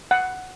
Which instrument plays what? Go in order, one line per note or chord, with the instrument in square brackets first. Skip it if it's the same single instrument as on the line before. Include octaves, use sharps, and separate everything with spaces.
[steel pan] F#5